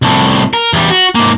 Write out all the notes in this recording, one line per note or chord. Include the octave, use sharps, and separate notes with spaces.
C2 A2
A#4
E2 G3
F#4
G#2 A#3